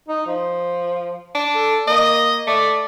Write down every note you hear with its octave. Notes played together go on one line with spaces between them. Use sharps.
D#4
F3
D4
A4
A#3 D#5
A3 D5